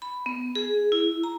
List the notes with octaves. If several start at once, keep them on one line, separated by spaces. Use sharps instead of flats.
B5
B3
G#4
E4
A#5